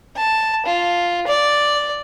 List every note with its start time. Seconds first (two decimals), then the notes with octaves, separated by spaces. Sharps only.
0.17 A5
0.66 F4
1.27 D5